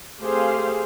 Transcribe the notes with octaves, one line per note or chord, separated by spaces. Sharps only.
A3 C4 G4 G#4 C5 F5